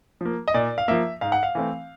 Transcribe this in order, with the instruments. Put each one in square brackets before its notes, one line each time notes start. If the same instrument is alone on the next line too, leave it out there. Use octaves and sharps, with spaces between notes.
[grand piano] F3 A#3
D#5
A#2 D5
F5
F3 A#3 E5
G#2 F5
F#5
F5
E3 A3 C4